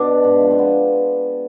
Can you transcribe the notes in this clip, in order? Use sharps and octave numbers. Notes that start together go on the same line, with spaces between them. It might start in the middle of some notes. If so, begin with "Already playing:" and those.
Already playing: B2 D4
G#2
F3
C4
B3